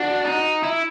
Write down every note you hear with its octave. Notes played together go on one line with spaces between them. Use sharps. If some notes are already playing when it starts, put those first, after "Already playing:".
Already playing: D4 F#4
D#4
E4